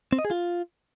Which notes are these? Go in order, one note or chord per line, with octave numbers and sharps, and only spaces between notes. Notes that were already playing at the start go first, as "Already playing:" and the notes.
C4
D#5
G#4
F4